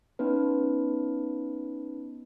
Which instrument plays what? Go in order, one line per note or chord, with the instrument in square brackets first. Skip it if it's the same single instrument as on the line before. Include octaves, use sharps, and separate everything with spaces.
[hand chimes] B3 C#4 D#4 B4